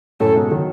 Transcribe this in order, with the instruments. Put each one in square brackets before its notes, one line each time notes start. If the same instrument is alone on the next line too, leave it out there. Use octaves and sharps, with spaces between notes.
[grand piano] F#2 A2 [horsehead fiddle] A4
[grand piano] G#2 B2
D#3 F#3